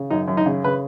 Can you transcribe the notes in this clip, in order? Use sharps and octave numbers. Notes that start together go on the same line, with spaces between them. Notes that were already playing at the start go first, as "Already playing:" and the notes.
Already playing: C#3
F#2 D#4
F#2
D#4
C#3
C#3 B4